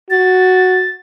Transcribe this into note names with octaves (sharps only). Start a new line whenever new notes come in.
F#4 A6